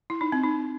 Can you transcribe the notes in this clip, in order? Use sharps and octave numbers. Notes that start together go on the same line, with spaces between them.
E4
D#4
C4
D#4